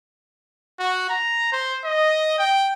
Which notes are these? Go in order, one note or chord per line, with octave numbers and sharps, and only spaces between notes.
F#4
A#5
C5
D#5
G5